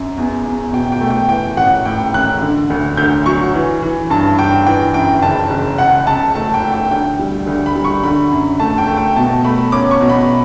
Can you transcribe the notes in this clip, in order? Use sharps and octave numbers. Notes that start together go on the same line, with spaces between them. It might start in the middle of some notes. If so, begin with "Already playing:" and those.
Already playing: F#2
E2
E2
B2 G5
G5
A3
G5
E3 G5
A1 F#5
A2 G5
A1 F#6
D3
D2
D2 G6
F#3 C#6
E3
E3
G2 A5
G2 G5
E3 G5
F#2 G5
F#1 A5
F#1
C#2 F#5
C#2 A5
A3 A5
G5
A3
G5
D2 G5
G3
D2
B5
G3
C#6
D3 B5
F#2
A3 A5
G5
A3
G5
B2 A5
A3 B5
C#4 D6
C#6
B2
B5